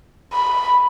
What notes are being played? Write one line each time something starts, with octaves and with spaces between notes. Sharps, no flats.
B5